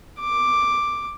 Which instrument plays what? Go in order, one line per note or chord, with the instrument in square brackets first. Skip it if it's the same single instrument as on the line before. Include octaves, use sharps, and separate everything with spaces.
[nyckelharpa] D6